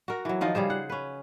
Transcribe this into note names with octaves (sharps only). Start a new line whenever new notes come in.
F#4 A#4
E3 F#3
D#3 F3 F4 D#5
C#3 G3 G#4 C5
F#5
C#4 B4